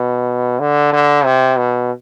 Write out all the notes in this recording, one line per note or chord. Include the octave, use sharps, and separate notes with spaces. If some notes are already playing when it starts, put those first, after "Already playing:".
Already playing: B2
D3
D3
C3
B2